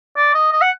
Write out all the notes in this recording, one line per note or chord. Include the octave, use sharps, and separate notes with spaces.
D5
D#5
D#5
F#5